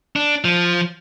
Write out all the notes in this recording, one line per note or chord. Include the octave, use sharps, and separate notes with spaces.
D4
F3